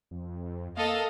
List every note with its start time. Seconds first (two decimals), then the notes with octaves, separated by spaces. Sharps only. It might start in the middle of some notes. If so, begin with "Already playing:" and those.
0.11 F2
0.77 A#3 A4 D#5 F5